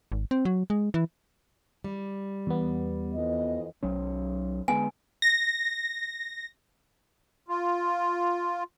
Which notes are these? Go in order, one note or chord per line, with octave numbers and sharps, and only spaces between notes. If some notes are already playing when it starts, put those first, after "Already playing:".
G#1
C4
F#3
G#3
E3
G3
E2 B3
F2 E3 D#5
B1 F#3 C#4
D3 G#3 B3 G#5
A#6
F4